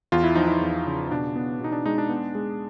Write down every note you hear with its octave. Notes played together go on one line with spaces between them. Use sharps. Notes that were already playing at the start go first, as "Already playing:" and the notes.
E2 F4
E4
F3 D#4
E4
E2
C#3
B2 D4
B3
B2 D#4
D4
G#3 D#4
D4
B3
G#3